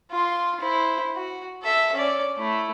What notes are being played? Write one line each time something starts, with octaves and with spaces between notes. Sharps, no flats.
F4 C6
E4 C5
F#4
A4 E5
C#4 D5
A3 E4